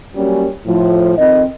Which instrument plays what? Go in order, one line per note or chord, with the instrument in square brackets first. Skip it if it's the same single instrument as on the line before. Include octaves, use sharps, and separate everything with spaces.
[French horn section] F#3 G3 A#3 C#4
A2 F3
F2 D#3 C4 D#5